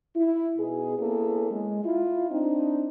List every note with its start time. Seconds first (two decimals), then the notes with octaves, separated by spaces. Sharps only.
0.15 E4
0.58 B2 B3 D#4 G#4
0.98 A#3 B3 C#4 E4 G#4 A4
1.51 G#3
1.84 E4 F4
2.30 C4 D4 D#4